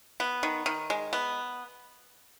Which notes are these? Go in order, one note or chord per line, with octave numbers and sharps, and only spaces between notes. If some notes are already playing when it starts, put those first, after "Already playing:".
B3
D#3
D#3
G#3
B3